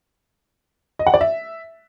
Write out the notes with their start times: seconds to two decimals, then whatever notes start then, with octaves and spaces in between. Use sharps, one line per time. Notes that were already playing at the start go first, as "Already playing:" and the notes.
0.99 D#5
1.07 F#5
1.14 D5
1.21 E5